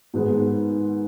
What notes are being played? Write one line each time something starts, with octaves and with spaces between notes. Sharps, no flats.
G#2 D#3 G#3 B3